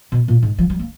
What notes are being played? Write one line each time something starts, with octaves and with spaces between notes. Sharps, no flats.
B2
A#2
G#2
F3
F#3
A#3